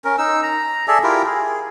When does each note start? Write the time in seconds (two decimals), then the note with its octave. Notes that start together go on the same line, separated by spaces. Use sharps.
0.05 C#4 A#4
0.18 D#4 E6
0.43 A#5
0.88 G#4 A4 D5 E5
1.03 E4 F4 G4 A#4
1.26 G#4